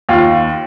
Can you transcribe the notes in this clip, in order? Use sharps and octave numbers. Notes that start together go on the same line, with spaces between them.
D#2 F4